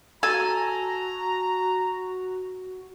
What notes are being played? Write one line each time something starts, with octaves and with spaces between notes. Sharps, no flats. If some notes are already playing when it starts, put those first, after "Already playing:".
F#4 A4 G#5 A#5